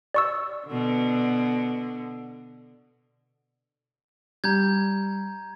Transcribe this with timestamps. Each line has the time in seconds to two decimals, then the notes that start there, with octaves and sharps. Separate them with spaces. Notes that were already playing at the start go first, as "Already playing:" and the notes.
0.14 D5 C#6 E6
0.67 B2 D3
4.44 G3 A#5 G6 G#6